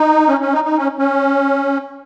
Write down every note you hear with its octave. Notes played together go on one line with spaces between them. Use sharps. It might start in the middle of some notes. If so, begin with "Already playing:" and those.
Already playing: D#4
C#4
C#4
D#4
D#4
C#4
C#4